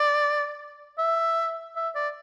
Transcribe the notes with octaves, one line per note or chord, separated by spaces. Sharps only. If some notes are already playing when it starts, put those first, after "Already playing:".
Already playing: D5
E5
E5
D5